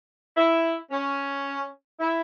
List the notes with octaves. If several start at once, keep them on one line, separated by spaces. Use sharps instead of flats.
E4
C#4
E4